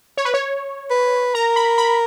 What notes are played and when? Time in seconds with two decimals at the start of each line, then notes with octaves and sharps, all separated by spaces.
0.17 C#5
0.25 B4
0.34 C#5
0.90 B4
1.34 A#4 A#5
1.56 B5
1.78 B5